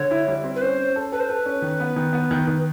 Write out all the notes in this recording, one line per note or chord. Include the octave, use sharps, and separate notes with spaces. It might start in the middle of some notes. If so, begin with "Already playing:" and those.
Already playing: D3 C#5
E4
G3
C4
B4
C#4 C5
C#4
A4
A4 B4
C5
A4 B4
C#4
D#3
B3
D#3
B3
D#3
D#3